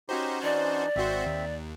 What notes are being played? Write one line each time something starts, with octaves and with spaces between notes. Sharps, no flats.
C#4 D#4 F#4 G4 C5 A#5
E3 D4 D#4 D5
G#1 C4 F#4 C5 E5
D#2